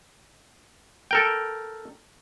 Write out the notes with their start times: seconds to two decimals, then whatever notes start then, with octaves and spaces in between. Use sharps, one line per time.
1.11 A4 A#4 G5